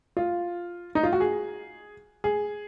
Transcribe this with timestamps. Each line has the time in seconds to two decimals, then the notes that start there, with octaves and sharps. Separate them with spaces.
0.17 F4
0.95 D#4
1.03 F4
1.12 F#4
1.20 G#4
2.24 G#4